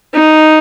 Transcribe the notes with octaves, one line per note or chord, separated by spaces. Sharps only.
D#4